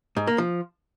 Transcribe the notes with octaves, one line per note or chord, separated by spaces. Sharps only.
G#2
A#3
F3